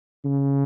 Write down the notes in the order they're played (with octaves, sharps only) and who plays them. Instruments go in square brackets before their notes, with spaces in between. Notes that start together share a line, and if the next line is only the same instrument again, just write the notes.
[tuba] C#3